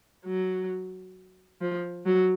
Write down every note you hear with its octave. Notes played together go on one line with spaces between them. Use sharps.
F#3
F3
F#3